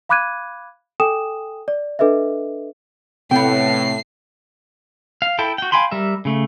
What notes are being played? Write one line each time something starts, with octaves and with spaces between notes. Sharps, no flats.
F5 B5 D6 F#6 G#6 D#7
A4 G5 G#5 D#6 E7
D5
D4 A4 B4 D#5 E5
A2 C3 B3 G5 C7
F5
E4 A4 G5
F#4 G5
F5 G5 G#5 B5 C6
G3 A#4 E5
C#3 A3